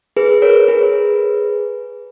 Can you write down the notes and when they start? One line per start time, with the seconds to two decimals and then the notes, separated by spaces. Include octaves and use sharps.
0.17 G#4 B4
0.42 A#4 C#5
0.68 G#4 B4